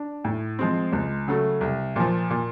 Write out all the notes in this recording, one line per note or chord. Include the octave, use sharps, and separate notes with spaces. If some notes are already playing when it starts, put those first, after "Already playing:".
Already playing: D4
A2
F3 G#3 C4
C#2
C#3 F#3 A3
C2
A#2 F3
A#2